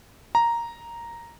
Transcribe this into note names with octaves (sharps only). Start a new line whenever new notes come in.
A#5